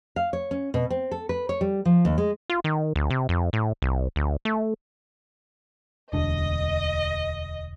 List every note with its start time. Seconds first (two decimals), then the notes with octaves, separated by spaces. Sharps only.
0.16 F5
0.33 C#5
0.51 C#4
0.74 B2
0.90 C4
1.11 A4
1.29 B4
1.49 C#5
1.61 G3
1.85 F3
2.05 D#2
2.18 G#3
2.50 F4
2.64 D#3
2.96 D2
3.10 C3
3.29 F2
3.53 A2
3.82 C2
4.16 D2
4.45 A3
6.13 E1 D2 D4 D#5